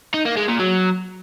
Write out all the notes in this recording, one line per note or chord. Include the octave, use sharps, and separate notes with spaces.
D#4
A#3
G#3
A#2
F#3